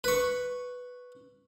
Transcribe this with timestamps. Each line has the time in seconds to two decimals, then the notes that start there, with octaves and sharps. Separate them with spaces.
0.04 B4 C#6